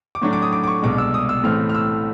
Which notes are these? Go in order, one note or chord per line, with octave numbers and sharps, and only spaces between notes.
D6
A2 F#3 A3 D4 C#6
D6
D#6
D6
D6
C#6
C2 B2 G#3 D6
E6
D#6
E6
A1 A2 E3 A3 C4 F6
F6
E6